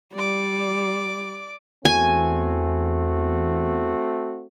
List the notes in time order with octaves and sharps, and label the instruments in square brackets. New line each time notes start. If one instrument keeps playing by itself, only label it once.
[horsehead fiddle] G3 [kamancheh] D5 D6
[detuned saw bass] E2 [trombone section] A3 C4 F#4 [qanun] G#5